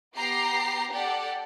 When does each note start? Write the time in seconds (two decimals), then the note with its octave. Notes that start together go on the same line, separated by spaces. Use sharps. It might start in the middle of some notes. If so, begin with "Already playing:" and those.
0.16 B3 G4 A#5 C7
0.92 G4 A4 D5 F#5